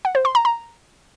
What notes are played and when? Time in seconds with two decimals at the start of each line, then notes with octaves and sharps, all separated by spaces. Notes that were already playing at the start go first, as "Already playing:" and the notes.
0.05 F#5
0.15 C5
0.25 C6
0.35 A#5
0.45 A#5